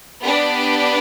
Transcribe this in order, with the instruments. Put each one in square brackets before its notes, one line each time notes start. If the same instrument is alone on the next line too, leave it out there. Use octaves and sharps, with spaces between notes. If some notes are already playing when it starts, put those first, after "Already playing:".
[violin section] B3 D4 G4 B4 D5